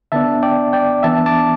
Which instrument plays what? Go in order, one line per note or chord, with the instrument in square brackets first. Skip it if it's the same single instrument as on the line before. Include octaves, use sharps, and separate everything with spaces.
[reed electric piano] D3 B3 D4 E5 A5
D5 G5
D5 G5
E3 B3 D4 E5 A5
A5 D6